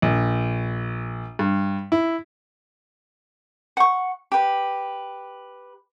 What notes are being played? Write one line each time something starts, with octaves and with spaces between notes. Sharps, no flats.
A#1
G2
E4
F#5 C#6
G4 B4